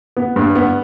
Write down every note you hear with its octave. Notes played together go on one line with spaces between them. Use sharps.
B3
G2
B3